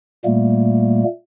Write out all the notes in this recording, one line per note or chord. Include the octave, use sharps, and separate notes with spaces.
A#2 G3 A3 A#3